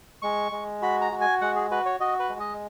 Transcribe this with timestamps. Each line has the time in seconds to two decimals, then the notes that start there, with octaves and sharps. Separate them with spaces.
0.22 G#3 C#6
0.52 G#3
0.82 F#4 B5
1.01 A#5
1.12 F#4
1.21 G#5
1.41 G#3 F#5
1.55 G#4
1.71 F#4 B4
1.86 C#5
2.00 F#4 D#5
2.20 B4
2.29 G#3
2.40 D#5